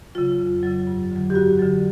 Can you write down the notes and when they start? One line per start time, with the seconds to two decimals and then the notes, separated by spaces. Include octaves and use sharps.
0.15 C#3 F#3 F4
0.39 F2
0.63 C#3 F#3
0.87 G2
1.11 D3 F#3
1.30 G4
1.34 G2 F#4
1.59 D3 F#3